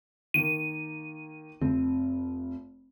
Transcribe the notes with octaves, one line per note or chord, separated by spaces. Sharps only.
D#3 A#3 A#4 D#7
F1 C4